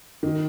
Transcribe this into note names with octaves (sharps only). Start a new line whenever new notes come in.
D#3